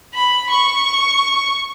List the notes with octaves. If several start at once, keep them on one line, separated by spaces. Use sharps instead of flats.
B5
C#6